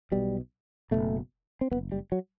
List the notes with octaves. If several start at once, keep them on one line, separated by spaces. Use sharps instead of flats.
B1 B2 G3
F#1 E2 B2 A3
C4
F#2 B3
F#1
G3
F#3